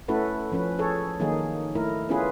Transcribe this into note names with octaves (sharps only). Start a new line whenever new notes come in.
A3 C#4 E4 F#4 A4 B4
F3 C#4 B4
G#4 A4 C#5
D#3 F#3 A#3 D#4 G#4
A3 E4 A#4
B3 C#4 E4 F4 G#4 B4